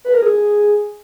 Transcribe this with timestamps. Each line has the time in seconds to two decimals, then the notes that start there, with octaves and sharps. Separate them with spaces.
0.05 B4
0.14 A#4
0.22 G#4